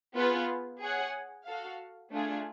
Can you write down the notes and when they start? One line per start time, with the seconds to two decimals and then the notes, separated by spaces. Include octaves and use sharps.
0.15 B3 F4 G#4 B4
0.80 G#4 C#5 F#5
1.45 F#4 A4 F5
2.10 A3 D4 F4 G#4